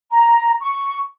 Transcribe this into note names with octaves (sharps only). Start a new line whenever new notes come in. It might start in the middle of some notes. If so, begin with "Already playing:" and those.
A#5
C#6